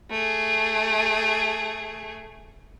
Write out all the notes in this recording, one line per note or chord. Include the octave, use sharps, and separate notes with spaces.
A3 G#4